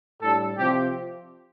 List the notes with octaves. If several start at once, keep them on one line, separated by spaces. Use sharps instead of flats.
A2 G3 D4 A4
C3 F3 C4 G4